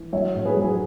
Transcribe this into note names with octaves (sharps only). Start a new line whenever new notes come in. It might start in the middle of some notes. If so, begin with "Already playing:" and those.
Already playing: E3
F#3 C#5 E5
A2 C#5
G#4 B4
F#3
G#4 B4